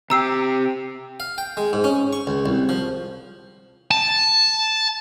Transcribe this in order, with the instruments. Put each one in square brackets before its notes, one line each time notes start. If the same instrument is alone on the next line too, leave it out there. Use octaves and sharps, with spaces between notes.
[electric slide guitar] C3 G4 G5 [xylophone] A#5 E6 C7
[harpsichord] F5
G5
G#3
G#2
C#4
C#6
C#2
C2
F3
[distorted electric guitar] A5